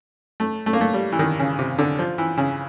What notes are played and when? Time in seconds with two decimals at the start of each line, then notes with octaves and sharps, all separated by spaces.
0.40 A3
0.66 A3
0.73 A#3
0.81 A3
0.93 G3
1.12 E3
1.19 D#3
1.39 C#3
1.59 C3
1.78 D3
1.99 F3
2.18 E3
2.37 C#3